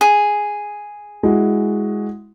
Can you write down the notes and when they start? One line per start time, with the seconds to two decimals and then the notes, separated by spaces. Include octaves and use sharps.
0.01 G#4
1.23 G#3 E4 F#4